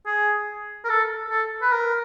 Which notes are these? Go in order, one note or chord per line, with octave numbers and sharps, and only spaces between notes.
G#4
A#4
A4
A4
B4
A#4